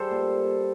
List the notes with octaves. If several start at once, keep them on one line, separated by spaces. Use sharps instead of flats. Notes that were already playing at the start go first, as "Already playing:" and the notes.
Already playing: G3 A4 C5
A#2